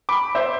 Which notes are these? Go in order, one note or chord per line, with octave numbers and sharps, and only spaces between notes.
B5 D6
C5 E5